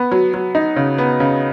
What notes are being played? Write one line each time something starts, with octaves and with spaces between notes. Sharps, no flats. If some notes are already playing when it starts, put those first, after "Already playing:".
Already playing: B3
F#3
F#3
D#4
C#3
B3
C#3